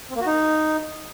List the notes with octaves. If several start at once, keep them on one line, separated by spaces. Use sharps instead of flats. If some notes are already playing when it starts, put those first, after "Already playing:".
C4
A#3
F#4
D#4